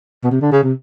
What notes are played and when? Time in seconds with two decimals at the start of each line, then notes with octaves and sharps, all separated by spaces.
0.23 B2
0.31 C3
0.41 D3
0.52 C#3
0.63 C3